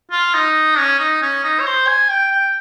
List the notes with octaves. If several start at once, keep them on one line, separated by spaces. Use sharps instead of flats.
F4
D#4
C#4
D#4
C#4
D#4
C#5
C5
G#5
G5
G5